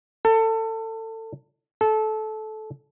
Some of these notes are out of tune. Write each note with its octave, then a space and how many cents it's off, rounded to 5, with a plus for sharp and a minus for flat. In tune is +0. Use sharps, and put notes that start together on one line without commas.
A4 +25
A4 -20